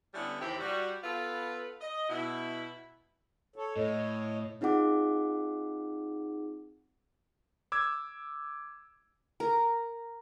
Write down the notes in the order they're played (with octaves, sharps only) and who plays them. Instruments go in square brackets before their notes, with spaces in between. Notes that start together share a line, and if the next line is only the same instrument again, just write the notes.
[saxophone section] D3 G3 B3 C#4 E4
D#2 C3 E3 C4 E4 G4
G3 F#4
B3 F4 A4 B4
D#5
B2 E4
[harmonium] A4 C#5
[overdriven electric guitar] A2 [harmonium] C#5 D#5
[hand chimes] C4 D#4 F4 G#4 F#5 D6
[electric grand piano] D6 E6 G#6
[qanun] A#4